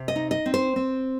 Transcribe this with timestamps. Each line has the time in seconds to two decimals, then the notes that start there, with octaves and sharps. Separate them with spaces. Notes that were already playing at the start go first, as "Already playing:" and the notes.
Already playing: C3
0.08 D#5
0.16 D#4
0.31 D#5
0.46 C4
0.54 C5
0.76 C4